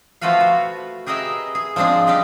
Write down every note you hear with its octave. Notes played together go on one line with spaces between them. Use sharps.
F3 A3 F4 F#4 B4 F5
F#4
G4 G#4 A#4 B4 D#5 E5
G#4
F3 G#3 C4 D4 G#4
G3 G4 B4 D#5